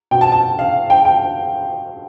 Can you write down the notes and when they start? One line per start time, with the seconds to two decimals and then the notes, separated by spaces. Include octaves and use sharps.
0.11 B2 G5
0.21 A5
0.32 A5
0.59 F5
0.90 G5
1.05 G5